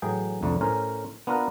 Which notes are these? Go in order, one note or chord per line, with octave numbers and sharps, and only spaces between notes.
A2 E3 F#3 G#4 G5
C2 F2 D3 A3 D4
A2 C#4 A#4 C5
B3 D4 F4 A#4 B4